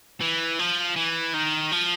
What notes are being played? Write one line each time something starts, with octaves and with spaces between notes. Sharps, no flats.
E3
F3
E3
D#3
F3